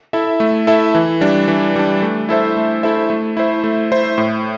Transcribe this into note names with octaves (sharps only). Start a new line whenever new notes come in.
E4 A4 E5
A3
E4 A4 E5
E3
G3 D4
E3
G3 D4
A3
E4 A4 C5 E5
A3
E4 A4 C5 E5
A3
E4 C5 E5
A3
E4 C5 E5
A2